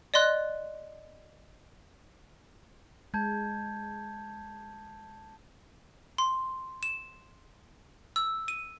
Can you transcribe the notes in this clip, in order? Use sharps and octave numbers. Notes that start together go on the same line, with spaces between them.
D5 D#5 C6 F#6
G#3 A5 G6 G#6
C6
E7
E6
D#7